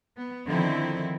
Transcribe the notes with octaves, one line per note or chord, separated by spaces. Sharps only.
B3
D3 D#3 F3 C4 D#4 E4